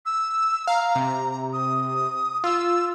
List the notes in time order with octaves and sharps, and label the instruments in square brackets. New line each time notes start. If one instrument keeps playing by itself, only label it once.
[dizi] E6
[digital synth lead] F5 [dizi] A#5
[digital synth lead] C3
[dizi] D#6
[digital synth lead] F4 [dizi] E6